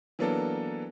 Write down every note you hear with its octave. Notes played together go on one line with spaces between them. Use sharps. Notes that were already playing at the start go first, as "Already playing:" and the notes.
E3 F#3 A#3 B3 D4 A4